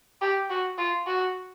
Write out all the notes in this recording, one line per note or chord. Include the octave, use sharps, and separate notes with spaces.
G4
F#4
F4
F#4